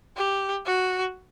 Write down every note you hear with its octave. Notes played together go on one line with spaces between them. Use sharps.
G4
F#4